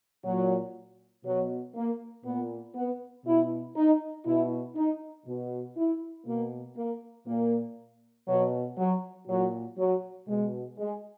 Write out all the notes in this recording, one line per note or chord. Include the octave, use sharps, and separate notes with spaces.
A#2 F#3
B2 F#3
A#3
A#2 B3
B3
B2 E4
D#4
B2 E4
D#4
B2
E4
B2 A#3
A#3
A#2 A#3
B2 F#3
F#3
A#2 F#3
F#3
B2 G#3
G#3